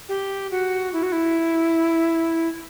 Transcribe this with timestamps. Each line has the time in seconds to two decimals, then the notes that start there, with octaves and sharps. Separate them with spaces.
0.09 G4
0.51 F#4
0.93 E4
1.03 F#4
1.12 E4